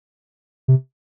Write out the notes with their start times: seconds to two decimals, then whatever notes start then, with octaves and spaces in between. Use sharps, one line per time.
0.68 C3